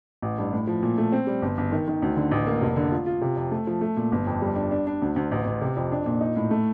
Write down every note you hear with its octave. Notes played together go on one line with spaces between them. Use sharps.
A1
G2
A2
F3
A#2
A3
C4
G3
G1
G1
D#3
D#3
D2
D3
A1
A#3
F1
D3
F4
F4
C3
F2
A3
F3
A3
A#2
G1
F2
G3
D4
D4
D4
D2
D2
A1
A1
C3
F2
D4
A#2
D#4
A2
A3